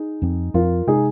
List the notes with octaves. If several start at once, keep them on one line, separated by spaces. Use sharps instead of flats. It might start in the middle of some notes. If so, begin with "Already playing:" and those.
Already playing: D#4 G#4
F2 F3 C4
F2 F3 C4 F4 A#4
C3 G#3 D#4 G#4